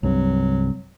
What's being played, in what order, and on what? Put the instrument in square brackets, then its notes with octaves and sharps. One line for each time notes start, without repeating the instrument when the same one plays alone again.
[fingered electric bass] C2 G2 C3 [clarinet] F#3